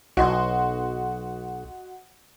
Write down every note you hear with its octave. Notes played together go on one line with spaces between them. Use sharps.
B1 F#4 D#5 C6